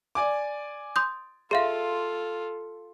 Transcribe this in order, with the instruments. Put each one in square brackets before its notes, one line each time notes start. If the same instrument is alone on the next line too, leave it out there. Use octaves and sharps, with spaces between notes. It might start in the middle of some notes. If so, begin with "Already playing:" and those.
[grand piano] D5 G#5 D6
[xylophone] C6 D#6 G6
[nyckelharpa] F4 A4 [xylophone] G#4 E5 F5 [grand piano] C6